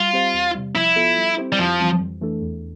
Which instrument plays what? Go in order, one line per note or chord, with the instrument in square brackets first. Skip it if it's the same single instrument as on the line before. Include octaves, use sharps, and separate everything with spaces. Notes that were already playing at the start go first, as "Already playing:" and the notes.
Already playing: [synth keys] G3 [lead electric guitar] F4
[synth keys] C4 G4 C5 F5
E2
C3 G3
[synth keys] F3 [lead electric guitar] E4
[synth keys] B3 F4 A4
G3
C4 E4 G4 C5
[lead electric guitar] G3
[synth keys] F2 [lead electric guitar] F3
[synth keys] E3 G3 C4
F2
E3 A3 D4 A4
E2